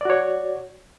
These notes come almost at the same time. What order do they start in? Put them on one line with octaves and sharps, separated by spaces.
D5 F#4 C#5